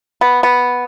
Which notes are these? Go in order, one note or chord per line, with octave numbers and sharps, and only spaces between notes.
B3
B3